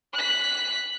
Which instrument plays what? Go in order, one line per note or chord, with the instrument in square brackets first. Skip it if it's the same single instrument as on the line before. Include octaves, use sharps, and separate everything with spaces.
[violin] F#6 B6